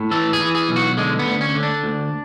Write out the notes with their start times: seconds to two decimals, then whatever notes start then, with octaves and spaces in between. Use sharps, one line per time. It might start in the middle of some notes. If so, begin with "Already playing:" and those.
Already playing: A2
0.11 E3 A4
0.33 G#4
0.40 E3
0.55 G#4
0.69 B1
0.76 F#4
0.97 D3 G#3
1.19 B3
1.26 D2
1.41 C#4
1.55 D3
1.63 D4
1.84 D2